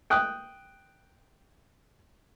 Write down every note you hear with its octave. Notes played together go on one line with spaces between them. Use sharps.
G5 D#6 F#6